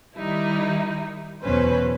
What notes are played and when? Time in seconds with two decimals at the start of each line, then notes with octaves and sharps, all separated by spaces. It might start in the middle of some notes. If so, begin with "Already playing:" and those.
0.17 D#3 G3 D#4 E4
1.43 E2 B2 F#3 C#4 B4 C5